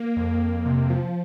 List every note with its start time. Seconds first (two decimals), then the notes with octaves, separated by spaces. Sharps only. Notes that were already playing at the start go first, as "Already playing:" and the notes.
Already playing: A#3
0.17 F2
0.41 A#3
0.66 C3
0.90 F3